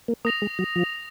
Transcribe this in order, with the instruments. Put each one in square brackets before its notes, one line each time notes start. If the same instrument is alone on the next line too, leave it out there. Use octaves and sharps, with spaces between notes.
[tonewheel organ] A#3
[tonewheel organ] A#3 [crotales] D#6 A#6 F7
[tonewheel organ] G#3
F#3
F3